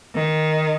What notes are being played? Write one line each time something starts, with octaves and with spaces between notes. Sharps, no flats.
D#3